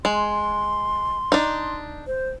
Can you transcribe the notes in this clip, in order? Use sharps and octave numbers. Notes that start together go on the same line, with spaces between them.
G#3 C6
D4 D#4
C5